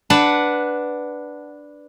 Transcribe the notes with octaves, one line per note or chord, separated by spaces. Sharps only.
D4 B4 F#5 A5